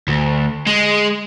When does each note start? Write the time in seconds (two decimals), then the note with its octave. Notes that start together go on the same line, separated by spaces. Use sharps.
0.08 D2
0.67 G#3